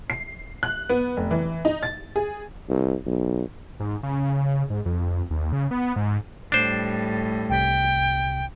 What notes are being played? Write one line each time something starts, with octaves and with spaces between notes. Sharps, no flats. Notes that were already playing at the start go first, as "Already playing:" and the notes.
C7
F#6
B3
F1
E3
D#4
A6
G#4
C2
B1
G#2
C#3
G#2
F2
D#2
C#3
B3
G#2
A2 G3 D4 C5
C2 C3 G5 B6